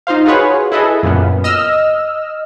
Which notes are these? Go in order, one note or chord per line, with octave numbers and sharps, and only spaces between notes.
D#4 F4 C5 F5
F4 F#4 G#4 B4 C#5 F#5
E4 G#4 A4 B4 D#5 E5
F#2 A#2 C#3 B3
D#5 E6 F6